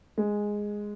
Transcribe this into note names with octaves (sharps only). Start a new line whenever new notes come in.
G#3